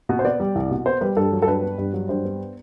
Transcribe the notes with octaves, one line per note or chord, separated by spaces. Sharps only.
B2
C5
B3 D5
G3
C2
B2
B3 C5
G3 B4
G2 A4
F#3
A4
G2 B4
B3
G2
F#3
G2 C5
B3